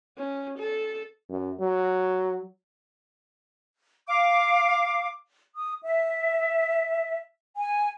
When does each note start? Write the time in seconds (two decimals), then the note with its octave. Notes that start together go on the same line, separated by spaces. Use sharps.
0.18 C#4
0.59 A4
1.29 F#2
1.60 F#3
4.07 F5 D6
5.55 D#6
5.83 E5
7.56 G#5